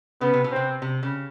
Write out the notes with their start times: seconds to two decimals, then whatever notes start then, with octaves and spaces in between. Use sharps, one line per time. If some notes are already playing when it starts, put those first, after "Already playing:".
0.21 C#3 B3
0.34 C3
0.44 B2
0.52 C3 C4
0.82 C3
1.03 C#3